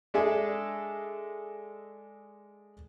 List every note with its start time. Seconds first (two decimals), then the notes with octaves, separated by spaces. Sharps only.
0.14 G#3 D4 G#4 A4 E5 G#5